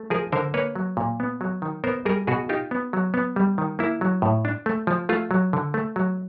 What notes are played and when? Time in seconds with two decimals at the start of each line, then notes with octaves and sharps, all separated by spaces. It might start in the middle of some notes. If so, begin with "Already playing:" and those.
Already playing: A3
0.10 F3 G#4 A#4
0.32 D3 A#4 C5
0.54 A#3 B4 C#5
0.75 F#3
0.97 A#2
1.20 B3
1.41 F#3
1.62 D#3
1.84 B3 A#4 C5
2.05 G3 G#4 A#4
2.27 B2 F#4 G#4
2.49 D#4 F4 G4
2.71 B3
2.93 F#3
3.14 B3
3.36 G3
3.58 D#3
3.79 A#3 E4
4.01 F#3
4.22 A2
4.45 D4
4.66 A3
4.87 F3
5.09 A3 F4
5.31 F#3
5.53 D3
5.74 A3
5.96 F#3